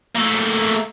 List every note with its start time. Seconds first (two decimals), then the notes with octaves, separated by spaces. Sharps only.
0.16 A3 A#3